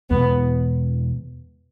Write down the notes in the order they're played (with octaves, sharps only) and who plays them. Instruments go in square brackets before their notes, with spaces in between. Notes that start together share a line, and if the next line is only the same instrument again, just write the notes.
[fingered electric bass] E2 B2 G#3 [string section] B3